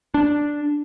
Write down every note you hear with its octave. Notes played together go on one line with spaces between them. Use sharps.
D4